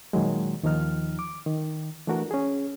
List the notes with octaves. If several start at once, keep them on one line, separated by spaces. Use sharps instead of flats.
A#2 D#3 F#3 G#3
D#2 D#3 F3 D#4 F6
D6
D#3
E3 A3 D4 F#4 A#4
C#4 G#4